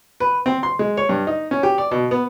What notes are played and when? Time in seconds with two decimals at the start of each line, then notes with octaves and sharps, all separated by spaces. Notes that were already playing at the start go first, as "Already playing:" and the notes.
0.20 B4
0.46 C4
0.63 C6
0.79 G#3
0.97 C#5
1.09 G2
1.27 D#4
1.51 C#4
1.63 G4
1.78 D5
1.91 B2
2.11 B3